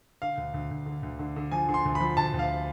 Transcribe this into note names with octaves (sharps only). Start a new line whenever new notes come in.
D3 F5
D2
D2
D2
D3
D2
D3
D3
F3 G#5
D3
C6
D2
B5
F3
D2 A5
D2
F5